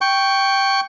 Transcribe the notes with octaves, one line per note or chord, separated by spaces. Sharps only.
G5 C#6